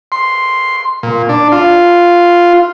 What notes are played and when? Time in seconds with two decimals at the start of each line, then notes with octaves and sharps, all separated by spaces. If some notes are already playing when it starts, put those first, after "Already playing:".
0.12 C6
1.03 A#2
1.29 D4
1.52 F4